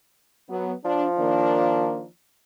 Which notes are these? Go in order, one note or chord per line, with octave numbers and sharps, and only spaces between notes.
F#3 B3
F3 D4
D#3 A#3 D4